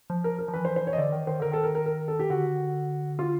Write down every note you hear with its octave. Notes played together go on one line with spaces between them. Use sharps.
F3
A#4
A#4
F3
E3 B4
C5
C5
C#5
D#5
D3 D5
D#3
D#3 C5
D3 A#4
D#3 A4
A#4
A#4
A#4
A4
G4
D3 F#4
F4